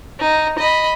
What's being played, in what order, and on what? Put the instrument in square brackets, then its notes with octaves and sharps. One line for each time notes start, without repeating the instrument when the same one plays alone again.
[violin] D#4
D#5 B5